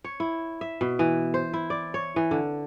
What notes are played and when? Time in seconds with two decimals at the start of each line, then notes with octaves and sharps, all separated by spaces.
0.04 C#5
0.20 E4
0.61 E5
0.81 B2
0.99 E3
1.34 C5
1.53 E4
1.70 D5
1.94 C#5
2.16 E3
2.31 D3